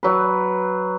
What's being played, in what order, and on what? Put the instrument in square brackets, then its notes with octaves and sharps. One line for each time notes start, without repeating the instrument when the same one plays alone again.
[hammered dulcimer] F#3 B4